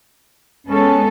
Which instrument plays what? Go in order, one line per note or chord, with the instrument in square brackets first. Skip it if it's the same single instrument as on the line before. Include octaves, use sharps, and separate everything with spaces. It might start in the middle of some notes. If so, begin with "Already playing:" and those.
[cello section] G#3 B3 A4 [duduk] C#4